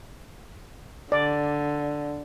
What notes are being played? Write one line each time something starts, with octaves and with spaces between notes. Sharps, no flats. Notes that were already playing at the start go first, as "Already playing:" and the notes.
D3 D5